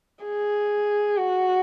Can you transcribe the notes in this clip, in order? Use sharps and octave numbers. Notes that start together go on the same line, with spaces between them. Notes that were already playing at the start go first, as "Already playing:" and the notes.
G#4
F#4